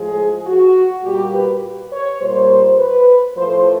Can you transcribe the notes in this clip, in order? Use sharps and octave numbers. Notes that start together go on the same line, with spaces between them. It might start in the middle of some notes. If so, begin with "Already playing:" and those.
Already playing: A2 F3 G#3 G#4
F#4
A#2 G3 A#3 G4
B4
C#5
A#2 G3 A#3 C5
B4
A2 F3 A3 C5